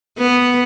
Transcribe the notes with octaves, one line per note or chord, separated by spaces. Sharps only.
B3